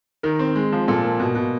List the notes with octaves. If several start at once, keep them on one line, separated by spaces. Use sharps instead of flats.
D#3 A#4
C4
G#3
F3
A#2 A4
A#3
B2
B2